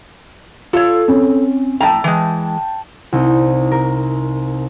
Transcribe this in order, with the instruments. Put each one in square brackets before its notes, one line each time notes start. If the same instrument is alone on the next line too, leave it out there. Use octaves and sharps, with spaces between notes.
[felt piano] F4 [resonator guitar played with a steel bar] A4 C#5
[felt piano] C4 C#4
[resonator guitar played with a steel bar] A2 A#5 [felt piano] G5 A5
[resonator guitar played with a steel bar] E3 G#3
[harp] C2 D#4
A#4